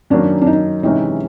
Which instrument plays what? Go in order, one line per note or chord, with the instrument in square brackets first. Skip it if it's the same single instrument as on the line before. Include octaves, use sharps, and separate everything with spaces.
[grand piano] F#2 D#3 F#3 A#3 C#4 [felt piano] D4
[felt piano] D4
D#4
[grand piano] C3 E3 G#3 C#4 [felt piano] D#4